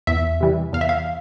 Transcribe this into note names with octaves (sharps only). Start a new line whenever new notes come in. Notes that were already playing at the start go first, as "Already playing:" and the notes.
E2 E5
C3 E3 G3
E2 F5
E5
F5